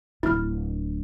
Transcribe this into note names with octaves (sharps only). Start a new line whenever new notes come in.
D1 D3 E4 F6